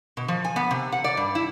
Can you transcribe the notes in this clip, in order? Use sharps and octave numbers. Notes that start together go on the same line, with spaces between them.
B2
F3
G#5
B3
C3
F#5
D5
G2
E4